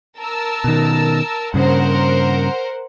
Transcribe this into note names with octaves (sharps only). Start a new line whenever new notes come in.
A#4 A5 E6
B2 D#3
G2 C#3 A#4 C5 F#5